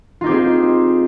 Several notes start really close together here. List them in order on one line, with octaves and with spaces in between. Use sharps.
F4 D#4 G4 C4 G#4